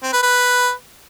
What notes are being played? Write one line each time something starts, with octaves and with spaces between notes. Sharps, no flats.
C4
B4
B4